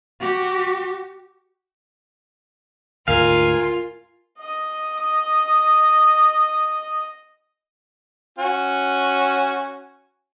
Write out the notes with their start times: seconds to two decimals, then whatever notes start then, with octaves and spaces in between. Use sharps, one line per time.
0.20 F#4 G4
3.08 D2 G#2 F4 A#4 F5 G#5
4.40 D#5 D#6
8.38 C#4 F#4 G#5